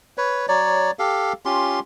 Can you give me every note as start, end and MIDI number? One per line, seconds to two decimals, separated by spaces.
0.18 0.46 71
0.18 0.46 73
0.48 0.91 54
0.48 0.91 73
0.48 0.91 74
0.99 1.33 67
0.99 1.33 69
0.99 1.33 77
1.45 1.80 61
1.45 1.80 65
1.45 1.80 67
1.45 1.80 84